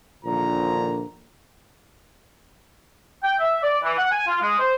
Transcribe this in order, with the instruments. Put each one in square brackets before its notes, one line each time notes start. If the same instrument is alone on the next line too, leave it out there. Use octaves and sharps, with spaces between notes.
[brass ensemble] A#1 A#2 D3 D#3 F3 A#5
[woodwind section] G5
E5
D5
E3
F#5
G#5
F4
G#3
C5